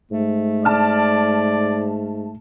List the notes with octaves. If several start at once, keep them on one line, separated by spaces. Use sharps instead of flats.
G#2 A3
D5 A5 F6